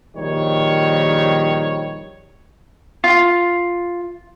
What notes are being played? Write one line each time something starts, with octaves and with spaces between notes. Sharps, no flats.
A#1 D#3 G3 C#5
F4